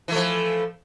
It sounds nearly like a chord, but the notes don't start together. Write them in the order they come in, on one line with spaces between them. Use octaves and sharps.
E3 A3 F3